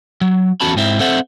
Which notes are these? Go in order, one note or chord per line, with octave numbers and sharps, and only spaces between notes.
F#3
E2 C#4 F#4 A4 A5 B5
G#2 C4 E4
C4 A4 C5 E5 F#5